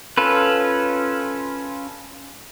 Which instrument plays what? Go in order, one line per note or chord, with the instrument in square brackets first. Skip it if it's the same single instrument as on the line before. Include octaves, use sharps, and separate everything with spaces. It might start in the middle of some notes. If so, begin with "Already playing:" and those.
[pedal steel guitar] C#4 F4 A4 B4